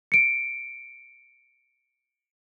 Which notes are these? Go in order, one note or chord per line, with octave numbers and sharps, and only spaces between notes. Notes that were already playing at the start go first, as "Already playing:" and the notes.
C#7 D7